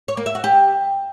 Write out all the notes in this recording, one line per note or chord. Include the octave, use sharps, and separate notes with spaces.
C#5
A#3
E5
F#4
G4